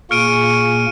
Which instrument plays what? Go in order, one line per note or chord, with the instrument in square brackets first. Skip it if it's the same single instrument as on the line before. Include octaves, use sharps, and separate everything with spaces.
[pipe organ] A#2 A#3 [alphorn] G#4 [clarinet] C#6 [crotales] F6 D7 D#7